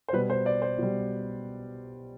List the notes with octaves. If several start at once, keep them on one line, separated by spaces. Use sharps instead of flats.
C5
B2 G3 B4
C5
D5
C5
B2 G3